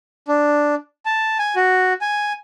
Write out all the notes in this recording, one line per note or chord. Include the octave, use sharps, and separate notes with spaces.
D4
A5
G#5
F#4
G#5